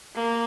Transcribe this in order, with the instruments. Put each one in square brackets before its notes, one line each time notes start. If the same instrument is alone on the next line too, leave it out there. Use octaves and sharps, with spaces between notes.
[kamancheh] A#3